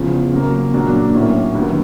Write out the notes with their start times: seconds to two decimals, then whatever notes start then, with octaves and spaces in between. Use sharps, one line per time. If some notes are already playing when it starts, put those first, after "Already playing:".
Already playing: E2 C#3 F3
0.32 C#3 F#3 A#3
0.73 A#2 F#3 A#3 D4 F#4
1.14 A2 F#3 A#3 C#4
1.55 D#2 D3 F#3 B3